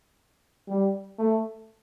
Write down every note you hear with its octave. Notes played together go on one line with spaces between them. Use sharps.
G3
A3